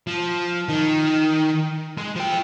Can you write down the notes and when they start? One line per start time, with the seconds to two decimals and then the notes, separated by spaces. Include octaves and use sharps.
0.07 F3
0.69 D#3
1.98 G#3
2.16 F3 G5